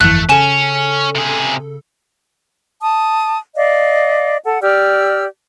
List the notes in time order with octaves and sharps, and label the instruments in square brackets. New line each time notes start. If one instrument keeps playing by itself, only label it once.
[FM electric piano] G1 F2 E3 [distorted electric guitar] A3 [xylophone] F#6
[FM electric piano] C#3 A4 [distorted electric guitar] C#4 [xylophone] G#5 E7
[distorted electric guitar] C3 G#4
[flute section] A5 D#6
D5 D#5 F5
A4 F#5
G4 D5 E6 F6